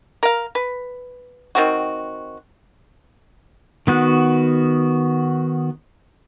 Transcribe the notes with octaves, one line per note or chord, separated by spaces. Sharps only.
A#4 F5
B4
D#3 C4 F#4
D#3 B3 F#4